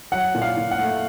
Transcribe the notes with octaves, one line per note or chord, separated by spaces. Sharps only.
F#3 F#5
A#2
F5
A#2
F#5
A3